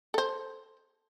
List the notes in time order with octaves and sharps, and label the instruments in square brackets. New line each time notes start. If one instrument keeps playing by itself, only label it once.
[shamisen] A4 C5